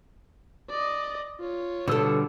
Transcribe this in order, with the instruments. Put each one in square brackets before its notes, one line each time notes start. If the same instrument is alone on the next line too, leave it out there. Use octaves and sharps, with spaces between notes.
[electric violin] D5 D#5
F4 C#5
[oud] B2 A4 [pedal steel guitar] D3 G3 E6